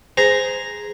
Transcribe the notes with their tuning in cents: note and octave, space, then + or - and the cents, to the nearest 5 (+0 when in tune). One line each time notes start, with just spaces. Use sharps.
G#4 +0 C5 -20 A#5 +0